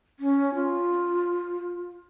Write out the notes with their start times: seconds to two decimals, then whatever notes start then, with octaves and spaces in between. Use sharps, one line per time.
0.20 C#4
0.54 F4